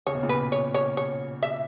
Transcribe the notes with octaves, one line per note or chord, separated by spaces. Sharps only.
C#3 C#5
B2
A#2 C#3
B4
C#5
C#5
C#5
E5